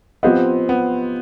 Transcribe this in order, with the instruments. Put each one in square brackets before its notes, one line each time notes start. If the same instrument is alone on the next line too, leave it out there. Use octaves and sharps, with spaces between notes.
[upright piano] F3 C4 G4 C5 D#5 [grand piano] B3
[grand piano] B3